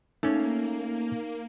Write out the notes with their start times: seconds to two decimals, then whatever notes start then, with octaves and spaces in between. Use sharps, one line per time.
0.23 A3 A#3 C#4 D#4